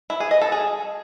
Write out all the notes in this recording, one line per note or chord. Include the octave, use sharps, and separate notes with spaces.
E4
G#4
D#5
A4
G#4